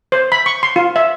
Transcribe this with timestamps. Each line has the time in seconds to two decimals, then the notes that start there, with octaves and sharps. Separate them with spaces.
0.12 C5
0.32 B5
0.46 C#6
0.63 C6
0.76 F4
0.96 E5